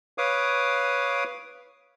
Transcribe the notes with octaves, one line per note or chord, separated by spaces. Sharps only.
B4 C#5 F5 D6 D#6